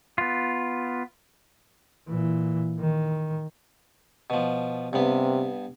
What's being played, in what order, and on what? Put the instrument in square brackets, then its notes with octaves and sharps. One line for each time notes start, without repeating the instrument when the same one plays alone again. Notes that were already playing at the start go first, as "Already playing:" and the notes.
[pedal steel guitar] B3 F4
[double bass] A#2 E3
D#3
[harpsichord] B2 F3
[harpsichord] G2 B3 [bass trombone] C3